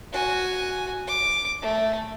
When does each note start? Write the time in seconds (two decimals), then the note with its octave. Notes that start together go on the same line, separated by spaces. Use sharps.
0.13 F#4 G#5
1.07 D6
1.62 A3